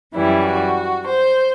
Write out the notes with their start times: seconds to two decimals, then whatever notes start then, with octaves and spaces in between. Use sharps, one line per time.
0.14 F#2 E3 G3 E4
0.45 F#4
1.07 C5